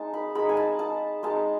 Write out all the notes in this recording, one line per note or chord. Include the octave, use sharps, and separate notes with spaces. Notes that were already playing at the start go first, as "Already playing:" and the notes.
Already playing: G#3 D#4 A5
B5
G#3 D#4 B5
G#5
A5
A5
G#3 D#4 A5